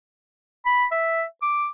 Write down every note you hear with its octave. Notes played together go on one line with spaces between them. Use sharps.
B5
E5
D6